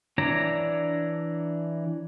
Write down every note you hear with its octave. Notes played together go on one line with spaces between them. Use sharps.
E3 D4 C#5 D5 A#5